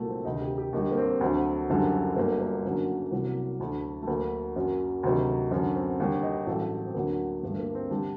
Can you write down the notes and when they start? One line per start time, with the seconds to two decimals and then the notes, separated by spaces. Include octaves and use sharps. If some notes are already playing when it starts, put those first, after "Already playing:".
Already playing: C2 A#2 F#3 A3 A#3
0.09 C4
0.25 D2 C3 D#3 D#4
0.41 G4
0.58 G4
0.73 D#2 D3 G3 D#4
0.91 A#3
0.97 C4
1.21 D2 D3 F#3
1.69 F#1 F#2 D3 G3
2.16 G1 G2 F#3 A#3
2.41 A#3
2.65 F#1 F#2 D3 F#3
3.12 C2 C3 F#3
3.60 D2 D3 F#3 A3
4.03 A3
4.07 D2 D3 F#3 A#3
4.56 F#2 F#3
5.03 D2 C3 D#3 F#3
5.51 F#2 D3 F#3
5.75 C4
6.00 D#2 D3 G3
6.23 D#4
6.47 A1 G2 F#3 A4
6.85 C4
6.94 D2 D3 F#3 A#3
7.43 G1 G2 D3 G3 A3
7.59 A#3
7.75 C4
7.90 D3 G3 D4